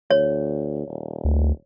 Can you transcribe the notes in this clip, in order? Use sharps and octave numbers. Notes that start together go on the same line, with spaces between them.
D2 C#5
D#1
D2